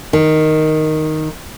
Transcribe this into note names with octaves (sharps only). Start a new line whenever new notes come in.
D#3